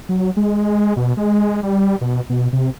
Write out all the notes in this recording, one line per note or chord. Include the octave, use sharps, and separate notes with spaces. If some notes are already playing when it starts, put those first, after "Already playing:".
F#3
G#3
B2
G#3
G3
B2
B2
C3